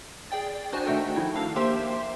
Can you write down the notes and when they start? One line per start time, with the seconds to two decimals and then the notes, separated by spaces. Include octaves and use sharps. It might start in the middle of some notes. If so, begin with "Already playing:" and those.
0.31 G#4 D5 G5 A6
0.73 D4 D#4 F#4 C5 G#5 A5
0.85 D#3 A3 D#4 F#4 A4 G5
1.16 F3 E4
1.36 D4 F5 E6
1.56 A#3 G4 C5 E5 G5 C6